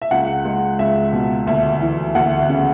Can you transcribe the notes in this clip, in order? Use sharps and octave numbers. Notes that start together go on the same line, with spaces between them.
E5
C#2 F#5
G#3
C#2 E5
B2
D2 E5
E3
D2 F#5
C#3